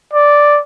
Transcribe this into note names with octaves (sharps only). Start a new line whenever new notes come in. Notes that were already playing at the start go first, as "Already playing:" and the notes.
D5